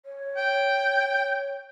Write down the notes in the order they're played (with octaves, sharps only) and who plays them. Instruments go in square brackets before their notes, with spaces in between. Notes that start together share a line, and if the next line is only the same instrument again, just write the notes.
[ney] C#5
[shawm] G5